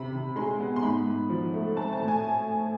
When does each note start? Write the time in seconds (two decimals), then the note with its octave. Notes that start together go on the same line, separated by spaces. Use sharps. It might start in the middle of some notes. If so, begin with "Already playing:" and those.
Already playing: C3 B5
0.13 C3
0.36 G#3 C6
0.60 B3
0.76 C6
0.83 G#2 B5
1.07 G#2
1.30 F3
1.54 A3
1.76 C4 A5
1.93 A5
2.00 A2
2.08 G#5